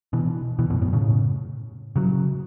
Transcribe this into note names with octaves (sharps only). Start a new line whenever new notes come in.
B2 E3
B2 E3
F#2 B2
F#2 B2
A2 C#3
C#3 F#3